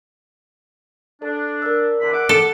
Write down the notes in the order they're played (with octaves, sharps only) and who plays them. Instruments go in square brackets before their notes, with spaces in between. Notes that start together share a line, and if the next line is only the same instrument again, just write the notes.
[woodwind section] D4 [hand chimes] A4
[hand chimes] A#4 D5 E6
[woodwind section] E2 D3 B5
E5 F#5 D6
[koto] A4